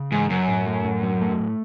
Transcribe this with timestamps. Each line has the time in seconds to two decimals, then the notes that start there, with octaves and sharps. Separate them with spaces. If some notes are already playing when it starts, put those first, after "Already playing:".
Already playing: C#3
0.12 G#2 E3
0.30 F#2 F#3
0.48 A2
0.67 A3
0.85 A2
1.03 F#3
1.21 A3
1.40 A2